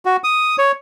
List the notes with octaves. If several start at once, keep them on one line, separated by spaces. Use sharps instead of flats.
F#4
D#6
C#5